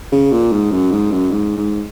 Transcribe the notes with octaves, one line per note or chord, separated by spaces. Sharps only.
C#3
A#2
G#2
F#2
G#2
F#2
G#2
G#2